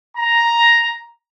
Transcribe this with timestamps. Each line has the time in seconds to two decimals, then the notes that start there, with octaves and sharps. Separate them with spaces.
0.17 A#5